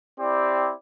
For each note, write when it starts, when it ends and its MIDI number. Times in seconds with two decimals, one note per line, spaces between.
0.19 0.72 60
0.19 0.72 64
0.19 0.72 67
0.19 0.72 74